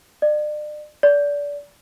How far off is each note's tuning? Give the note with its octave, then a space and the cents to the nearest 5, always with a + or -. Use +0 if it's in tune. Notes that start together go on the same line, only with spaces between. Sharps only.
D5 +40
D5 -25